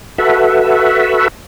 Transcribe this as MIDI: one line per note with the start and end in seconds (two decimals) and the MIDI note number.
0.18 1.28 66
0.18 1.28 69
0.18 1.28 71
0.18 1.28 76